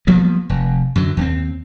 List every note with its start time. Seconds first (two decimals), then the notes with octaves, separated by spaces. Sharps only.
0.07 F3 G3 A#3 B3
0.49 F1
0.96 F#2 D3 F#3
1.17 D#2 A#3 C4